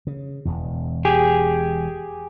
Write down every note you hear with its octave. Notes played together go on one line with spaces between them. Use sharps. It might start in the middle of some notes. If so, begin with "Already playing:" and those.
C#3
E1 E2
G4 G#4